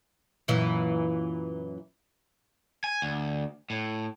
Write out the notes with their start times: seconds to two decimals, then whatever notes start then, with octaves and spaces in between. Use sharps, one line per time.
0.48 F#2 A#2 E3
2.84 G#5
3.02 D2
3.70 A2